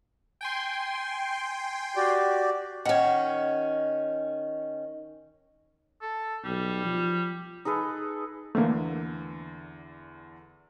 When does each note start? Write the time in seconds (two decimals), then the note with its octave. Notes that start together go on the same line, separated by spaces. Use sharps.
0.41 G5 G#5 C6
1.96 F#4 G4 D5
2.85 D#3 C#4 C#5 F#5
6.01 A4
6.44 B1 G3
6.85 F3
7.65 D#4 G#4 A4 B4
8.55 E2 D3 A3 A#3